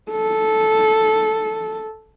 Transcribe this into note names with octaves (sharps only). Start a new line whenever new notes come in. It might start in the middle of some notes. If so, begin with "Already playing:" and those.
A4